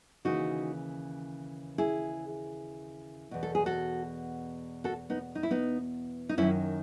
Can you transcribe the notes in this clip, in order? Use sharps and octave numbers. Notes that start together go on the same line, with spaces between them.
D#2 C#3 E3 D#4 F#4
E4 G#4
E2 B2
A4
G#4
F#4 A4
F#4 A4
B3 D#4
D#4
E4
B3 D#4
D#4
F#2 D#3 C#4 E4